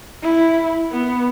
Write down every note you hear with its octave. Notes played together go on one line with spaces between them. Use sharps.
E4
B3